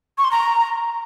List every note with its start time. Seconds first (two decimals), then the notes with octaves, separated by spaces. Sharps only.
0.18 C#6
0.24 C6
0.31 A#5